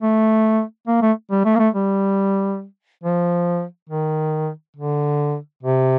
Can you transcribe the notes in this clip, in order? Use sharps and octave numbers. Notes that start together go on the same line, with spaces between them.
A3
A#3
A3
G3
A3
A#3
A3
G3
F3
D#3
D3
C3